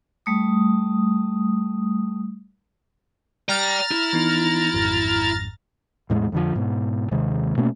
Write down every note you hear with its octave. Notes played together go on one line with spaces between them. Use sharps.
G3 A3 D#6
D5 G5 A#5 F6 A6
E4
E3 B3 D#4
G#1 F2 G#2
E2 A2 G#3
F2 D3 F3
G#2 B2
D#2 C3 D#3 G#3
B2 A3 A#3 C#4